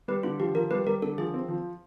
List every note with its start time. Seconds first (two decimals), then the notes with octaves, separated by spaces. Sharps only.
0.08 G3 B4
0.23 D3 F4
0.39 F3 G4
0.55 F3 A#4
0.71 G3 B4
0.87 G3 A#4
1.02 D3 A4
1.18 F3 G#4
1.34 C4
1.49 F3